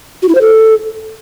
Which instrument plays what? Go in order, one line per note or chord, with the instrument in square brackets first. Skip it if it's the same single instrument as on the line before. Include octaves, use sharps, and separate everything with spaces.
[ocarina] F#4
E4
C5
A4